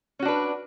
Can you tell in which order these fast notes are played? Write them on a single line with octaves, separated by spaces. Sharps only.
C#4 F#4 D4 B4